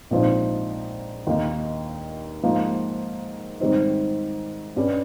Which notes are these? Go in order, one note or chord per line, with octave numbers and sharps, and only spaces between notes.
A#1 G#2 F3 C4 D#4
D#2 D#3 A#3 D#4
G#2 F3 A#3
G#2 D#3 G3 C4 D#4
G2 G3 C#4